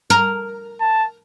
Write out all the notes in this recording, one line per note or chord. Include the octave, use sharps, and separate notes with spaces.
A#4
A5